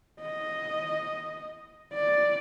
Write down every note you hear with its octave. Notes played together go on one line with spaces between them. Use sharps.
D#5
D5